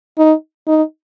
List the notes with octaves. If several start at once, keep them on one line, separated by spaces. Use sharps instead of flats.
D#4
D#4